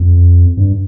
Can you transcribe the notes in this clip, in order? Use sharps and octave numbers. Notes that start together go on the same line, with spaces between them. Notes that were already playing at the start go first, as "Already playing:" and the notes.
Already playing: F2
G2